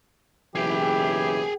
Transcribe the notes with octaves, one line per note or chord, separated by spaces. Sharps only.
F#1 B1 E3 G4 G#4 G5